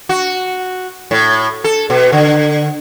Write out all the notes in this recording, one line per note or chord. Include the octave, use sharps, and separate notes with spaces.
F#4
A2
A4
B2
D3